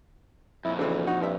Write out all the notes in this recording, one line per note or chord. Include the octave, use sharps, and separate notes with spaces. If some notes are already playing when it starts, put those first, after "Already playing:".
F2 A#2 E4
D2 C#3 E3
D#4 F#4
G2 F3 E5